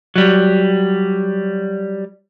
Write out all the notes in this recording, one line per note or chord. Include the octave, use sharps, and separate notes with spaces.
F#3 G3